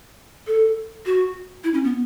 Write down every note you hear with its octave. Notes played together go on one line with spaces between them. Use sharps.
A4
F#4
E4
C#4
B3